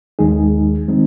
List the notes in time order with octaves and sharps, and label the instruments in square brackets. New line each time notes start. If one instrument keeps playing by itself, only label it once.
[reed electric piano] D#2 D#3 G#3 D#4 G#4
D#3 G#3 C4 D#4